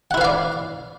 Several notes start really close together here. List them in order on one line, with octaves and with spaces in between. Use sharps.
F#5 E4 B4 F5 D5